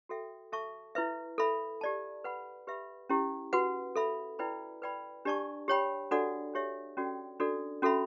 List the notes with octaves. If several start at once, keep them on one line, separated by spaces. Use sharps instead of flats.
F#4 A4 E5 G5
A4 E5 A5 C#6
E4 B4 E5
A4 E5 B5
G4 D5 A5
B4 F#5 B5
G4 B4 E5 B5
C#4 E4 G4
F#4 B4 F#5
A4 E5 B5
E4 B4 D5 G5 B5
B4 D5 G5 B5
D4 G4 D5 A5 C#6
G4 C#5 G5 B5
D4 F#4 A4 D5 F#5
D4 G4 C#5 E5
C#4 F#4 A4 D5 G5
D4 F#4 A4 D5
C#4 F#4 A4 E5 B5